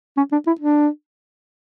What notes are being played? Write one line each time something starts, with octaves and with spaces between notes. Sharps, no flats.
C#4
D4
E4
D4